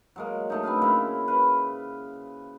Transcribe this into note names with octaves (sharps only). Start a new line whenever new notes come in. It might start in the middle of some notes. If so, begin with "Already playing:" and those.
F#3 G#3 A#3
F#3 A3 D#4
C4 D4 B4 F5
C#3 A#3 E4
B4 F5